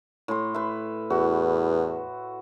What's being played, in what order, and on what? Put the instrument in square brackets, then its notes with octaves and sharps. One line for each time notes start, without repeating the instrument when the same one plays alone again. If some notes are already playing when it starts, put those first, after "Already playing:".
[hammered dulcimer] A2 C6
B4 E5
[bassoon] E2 [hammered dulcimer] F#4